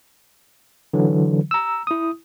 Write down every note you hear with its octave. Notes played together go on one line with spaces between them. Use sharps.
D3 E3 F#3
A#5 E6
E4 D#6